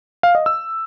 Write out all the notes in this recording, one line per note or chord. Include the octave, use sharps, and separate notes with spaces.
F5
D#5
E6